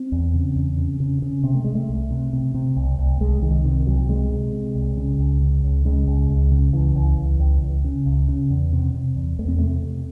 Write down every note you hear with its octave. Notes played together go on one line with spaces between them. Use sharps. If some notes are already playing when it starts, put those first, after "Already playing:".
Already playing: C4
E2
C#3
E2
C#3
C#3
C#3
C3 C4
A3
C3 G#3
A3
C2
C3
C3
C3
C2
C2
C2 G#3
C2 D#3
C3 D#3
C2 F#3
F#3
C3 G#3
C3
C3
C2
C#3
C#2
C#3
C#2
C#3 G#3
C#2
C#2
C#3
C#2 E3
C#2
C#2
C#2
C#2
C#3
C#2
C#3
E2
C3
C3
E2
E2 A3
C4
C3 A3
C3